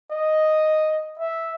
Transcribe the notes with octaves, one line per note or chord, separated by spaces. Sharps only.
D#5
E5